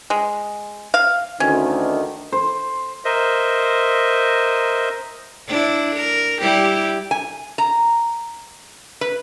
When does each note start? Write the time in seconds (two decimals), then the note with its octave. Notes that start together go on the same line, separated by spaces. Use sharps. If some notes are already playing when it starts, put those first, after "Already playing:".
0.10 G#3
0.94 F5
1.40 D2 D#3 C#4
2.32 C5
3.05 A#4 C5 D#5 E5
5.48 D4 E4
5.96 A#4
6.40 G3 E4 G4
7.11 G#5
7.58 A#5
9.01 B4